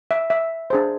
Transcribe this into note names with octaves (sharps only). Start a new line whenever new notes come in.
E5
E5
D4 G#4 C5